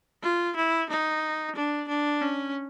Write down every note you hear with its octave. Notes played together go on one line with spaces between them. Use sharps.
F4
E4
D#4
D4
D4
C#4